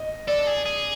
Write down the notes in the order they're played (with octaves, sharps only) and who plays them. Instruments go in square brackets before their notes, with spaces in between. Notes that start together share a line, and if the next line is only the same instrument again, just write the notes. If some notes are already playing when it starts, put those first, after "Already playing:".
Already playing: [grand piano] D#5
[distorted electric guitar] A4 [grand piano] D5
[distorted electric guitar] G#4
G#4